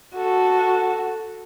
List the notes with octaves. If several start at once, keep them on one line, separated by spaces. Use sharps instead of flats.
F#4 A4